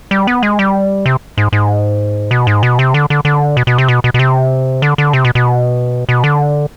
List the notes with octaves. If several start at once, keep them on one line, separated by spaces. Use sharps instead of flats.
G3
B3
G#3
G3
C3
G#2
G#2
B2
G#2
B2
C3
D3
D3
D3
B2
B2
C3
B2
B2
B2
C3
D3
D3
C3
B2
B2
B2
D3